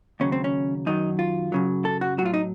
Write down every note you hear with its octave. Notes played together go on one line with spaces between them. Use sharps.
D#2 C#3 F#3 C#4
C4
C#4
F#2 D#3 F#3 D#4
F4
F#2 C#3 F#3
A4
F#4
A2 F#3 F4 F#4
D#4